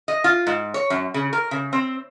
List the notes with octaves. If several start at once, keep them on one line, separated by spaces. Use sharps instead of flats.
D#5
F4
G#2
C#5
F#2
C#3
A#4
C#3
C4